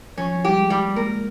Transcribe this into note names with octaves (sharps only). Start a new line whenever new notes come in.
F3 C#4
F3
G3 G4
G#3
G3
G#3
A#3 A#4